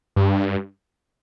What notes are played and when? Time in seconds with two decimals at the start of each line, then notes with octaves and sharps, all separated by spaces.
0.16 G2